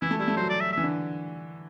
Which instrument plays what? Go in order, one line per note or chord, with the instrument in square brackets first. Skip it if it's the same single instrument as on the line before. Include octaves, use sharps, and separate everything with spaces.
[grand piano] E3 [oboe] E4
[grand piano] A3
[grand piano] G3 [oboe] E4
[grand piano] A3
[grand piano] F#3 [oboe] C5
[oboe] D5
E5
E5
[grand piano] E3
D3